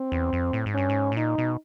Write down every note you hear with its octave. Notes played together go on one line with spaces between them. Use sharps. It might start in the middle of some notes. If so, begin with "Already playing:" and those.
Already playing: C4
E2
F2
A2
G#2
G2 C#4
G#2
A2
A#2 D#4
B2